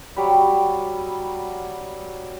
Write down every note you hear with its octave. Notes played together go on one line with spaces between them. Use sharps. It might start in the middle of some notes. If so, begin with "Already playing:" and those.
F#3 G3 B5